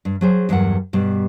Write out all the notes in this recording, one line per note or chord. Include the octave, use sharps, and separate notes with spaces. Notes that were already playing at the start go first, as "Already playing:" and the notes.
G2
F#3 G#4 C5
E2 G2 F#3 A#4 F#5
G2 B2 G3